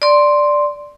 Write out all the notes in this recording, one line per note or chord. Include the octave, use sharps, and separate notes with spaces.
D5 C6